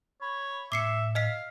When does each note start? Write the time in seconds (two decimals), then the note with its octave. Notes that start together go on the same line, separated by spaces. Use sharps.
0.21 C#5 B5
0.72 A2 E5 D6 C7 C#7
1.15 D#5 F5 F6 B6